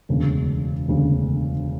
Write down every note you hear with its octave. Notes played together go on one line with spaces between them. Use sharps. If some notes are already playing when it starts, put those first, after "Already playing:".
E1 D2 C#3
E1 D2 C#3